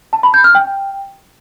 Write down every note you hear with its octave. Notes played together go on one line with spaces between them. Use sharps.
A5
B5
G6
F6
G5